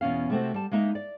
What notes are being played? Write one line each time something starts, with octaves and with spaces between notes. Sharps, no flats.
E2 B2 C#4 F5
C3 A3 C4 F#4
G3 A5
G#3 A#3 D#4 E5
D5